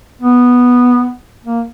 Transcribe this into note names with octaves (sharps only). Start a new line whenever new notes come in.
B3
A#3